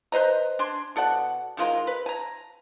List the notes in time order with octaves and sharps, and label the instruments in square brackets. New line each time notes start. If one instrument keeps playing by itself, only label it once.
[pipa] B4 C5 D#5 A#5
D4 G#5 C6
B2 A4 D5 F#5
D#3 G#3 F4 A#4
B4
G#5 A#5